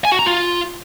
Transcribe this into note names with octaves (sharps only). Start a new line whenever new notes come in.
G#5
F#4
A#5
F4